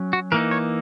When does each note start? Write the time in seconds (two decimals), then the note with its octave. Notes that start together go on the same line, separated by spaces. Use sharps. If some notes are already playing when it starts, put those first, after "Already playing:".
Already playing: F#3 C#4
0.13 F#4
0.32 E3 A#3 D#4 A#4
0.51 C#5